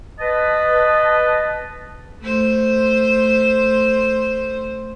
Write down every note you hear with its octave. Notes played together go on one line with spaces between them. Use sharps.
B4 D#5 A5
A3 C5